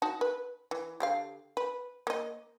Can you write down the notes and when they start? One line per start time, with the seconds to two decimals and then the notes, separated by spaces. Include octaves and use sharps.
0.02 D#4 F#4 A5
0.21 B4
0.71 E3
1.00 D3 G4 F5
1.57 B4
2.07 A#3 D#5